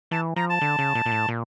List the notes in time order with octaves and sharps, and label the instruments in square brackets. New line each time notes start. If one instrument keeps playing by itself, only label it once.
[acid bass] E3 [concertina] A5
[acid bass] F3 [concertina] A#5
[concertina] A5
[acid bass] D3
C#3
A#2
A#2
A2
A#2